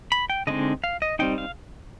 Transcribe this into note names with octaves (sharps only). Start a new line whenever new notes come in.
B5
G5
D3 G#3 C4 D#4 D#5
F5
D#5
G3 C4 D#4 G5
F5